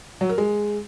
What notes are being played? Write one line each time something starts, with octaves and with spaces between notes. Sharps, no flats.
F#3
A#4
G#3